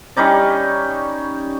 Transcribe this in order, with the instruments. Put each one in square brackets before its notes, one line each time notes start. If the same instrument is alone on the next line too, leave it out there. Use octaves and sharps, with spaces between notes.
[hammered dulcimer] G3 C#4 D#4 D5